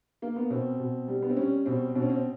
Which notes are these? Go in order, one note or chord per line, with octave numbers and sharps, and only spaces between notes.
A#3
B3
B2 C4
B2
G3
B3
C4
G3 C#4
B2 C4
B2 C4
C#4
C4